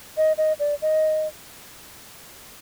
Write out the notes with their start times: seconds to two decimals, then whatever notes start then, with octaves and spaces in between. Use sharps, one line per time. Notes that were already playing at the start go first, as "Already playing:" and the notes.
0.17 D#5
0.38 D#5
0.59 D5
0.82 D#5